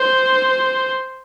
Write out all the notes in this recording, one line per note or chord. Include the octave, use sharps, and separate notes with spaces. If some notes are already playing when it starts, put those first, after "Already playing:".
Already playing: C5